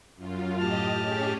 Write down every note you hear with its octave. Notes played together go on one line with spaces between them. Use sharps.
F#2 F4
A2 G4 D#5 A5 F6
C#4 G4 G#4